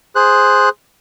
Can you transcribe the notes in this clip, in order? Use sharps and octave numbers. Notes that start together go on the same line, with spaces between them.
G#4 C5 F#6